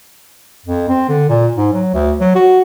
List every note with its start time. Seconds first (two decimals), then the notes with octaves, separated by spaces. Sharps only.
0.66 F2
0.89 C4
1.09 D3
1.29 A#2
1.56 G#2
1.73 F#3
1.94 D2
2.20 F#3
2.35 F#4